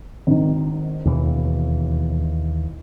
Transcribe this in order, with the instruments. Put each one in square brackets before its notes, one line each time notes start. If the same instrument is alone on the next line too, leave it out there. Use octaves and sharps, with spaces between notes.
[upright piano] G#1 D#3
[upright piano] E1 [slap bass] D#2 E3